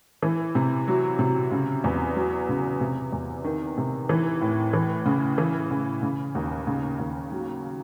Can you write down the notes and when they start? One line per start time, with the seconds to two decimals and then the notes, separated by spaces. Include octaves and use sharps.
0.23 E3
0.55 C3
0.88 F#3
1.19 C3
1.51 C#3
1.84 E2
2.16 F#3
2.49 C#3
2.81 C3
3.12 E2
3.44 D#3
3.78 C3
4.09 E3
4.41 A2
4.73 E3
5.06 C#3
5.38 E3
5.71 C#3
6.03 C#3
6.35 D#2
6.67 C#3
6.99 D#2
7.32 F#3